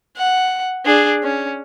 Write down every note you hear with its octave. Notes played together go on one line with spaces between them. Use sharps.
F#5
D4 G#4
C#4